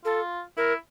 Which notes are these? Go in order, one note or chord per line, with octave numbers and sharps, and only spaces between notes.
F4 A4
E4 A#4